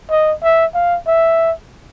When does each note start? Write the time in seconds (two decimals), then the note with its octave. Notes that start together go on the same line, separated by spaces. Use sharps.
0.10 D#5
0.43 E5
0.75 F5
1.07 E5